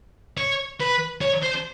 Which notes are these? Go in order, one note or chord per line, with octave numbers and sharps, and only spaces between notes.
C#5
B4
C#5
C5